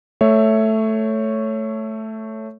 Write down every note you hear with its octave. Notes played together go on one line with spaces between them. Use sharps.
A3 C#5 E5